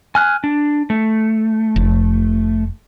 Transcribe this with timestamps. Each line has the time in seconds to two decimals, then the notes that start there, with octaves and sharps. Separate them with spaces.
0.15 G#5 F6 F#6
0.44 D4
0.90 A3
1.76 F1